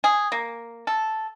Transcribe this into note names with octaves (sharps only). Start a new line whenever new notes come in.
G#4
A#3
A4